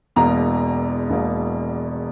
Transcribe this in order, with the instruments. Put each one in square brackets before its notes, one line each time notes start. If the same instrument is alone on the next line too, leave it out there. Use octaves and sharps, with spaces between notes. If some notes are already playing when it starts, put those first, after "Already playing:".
[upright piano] E1 E2 B2 A#3 A#5
E1 E2 B2 A#3